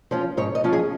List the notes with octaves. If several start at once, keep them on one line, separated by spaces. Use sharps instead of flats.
F3 C#4 F4
G#2 C#5
D#5
F3 C#4 F4
G#4